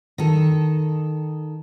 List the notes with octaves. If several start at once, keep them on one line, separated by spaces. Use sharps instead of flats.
D#3 A4